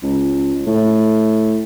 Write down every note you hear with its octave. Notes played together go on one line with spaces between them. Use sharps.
C#2
A2